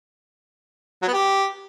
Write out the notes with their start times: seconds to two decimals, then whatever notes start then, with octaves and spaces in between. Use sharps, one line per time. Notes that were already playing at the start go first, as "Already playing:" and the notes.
1.02 F#3
1.08 B3
1.13 G4